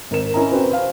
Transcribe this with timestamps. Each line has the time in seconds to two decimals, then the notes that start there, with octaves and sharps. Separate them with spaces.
0.11 G#1 A#4 E7
0.34 C#4 E4 A#4 D#5 A#5
0.51 C4 F#4 B4
0.70 C5 F5